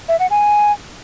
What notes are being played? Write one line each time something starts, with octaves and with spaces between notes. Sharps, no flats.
E5
F#5
G#5